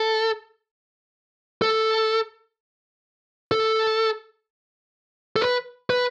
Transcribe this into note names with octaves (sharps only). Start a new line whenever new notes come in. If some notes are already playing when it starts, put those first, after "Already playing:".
Already playing: A4
A4
A4
A4
B4
B4